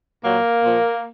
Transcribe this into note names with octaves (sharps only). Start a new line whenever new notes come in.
A#2 F#3 A#3
A#2 F3